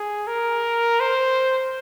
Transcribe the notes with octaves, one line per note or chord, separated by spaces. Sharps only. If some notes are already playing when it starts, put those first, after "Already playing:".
Already playing: G#4
A#4
C5